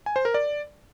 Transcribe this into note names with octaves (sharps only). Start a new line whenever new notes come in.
G#5
C5
A#4
D5